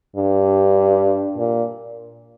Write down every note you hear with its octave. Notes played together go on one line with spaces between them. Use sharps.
G2
A#2